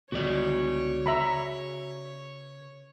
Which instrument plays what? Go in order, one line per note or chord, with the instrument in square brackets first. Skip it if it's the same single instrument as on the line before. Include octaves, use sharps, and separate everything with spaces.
[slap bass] C#2 D3 B3 [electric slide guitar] F#4 G#4 D5 [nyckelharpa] C#5
[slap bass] C#3 [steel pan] E5 A#5 B5